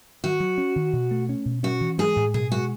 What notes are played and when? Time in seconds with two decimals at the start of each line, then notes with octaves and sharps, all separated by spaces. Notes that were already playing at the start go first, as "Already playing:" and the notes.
0.24 D#3 F#4
0.40 F#3
0.58 C#4
0.76 D#3
0.93 B2
1.11 A3
1.29 C#4
1.46 B2
1.63 C#4 F#4
1.81 E3
1.98 G#3 G#4
2.16 A2
2.34 B2 G#4
2.51 G#3 F#4